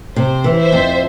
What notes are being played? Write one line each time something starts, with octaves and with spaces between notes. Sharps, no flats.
C3 C5
E3
C5 E5
F2